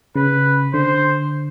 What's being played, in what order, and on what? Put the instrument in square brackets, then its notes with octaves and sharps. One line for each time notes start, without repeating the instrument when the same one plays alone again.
[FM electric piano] C#3 [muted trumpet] B4
[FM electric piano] D3 [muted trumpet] C5